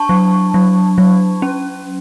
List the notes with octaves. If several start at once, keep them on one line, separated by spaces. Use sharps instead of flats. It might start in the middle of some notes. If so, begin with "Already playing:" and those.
Already playing: D4 A5 C#6
F#3
F#3
F#3
C#4